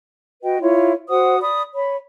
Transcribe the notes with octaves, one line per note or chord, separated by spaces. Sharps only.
F#4 B4 D#5 G5
E4 F4 C#5
F#4 C5 F#5 D#6
D5 B5 D#6
C#5 B5